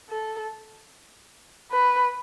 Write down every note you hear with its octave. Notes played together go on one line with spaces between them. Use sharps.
A4
B4